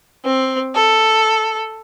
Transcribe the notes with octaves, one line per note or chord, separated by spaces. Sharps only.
C4
A4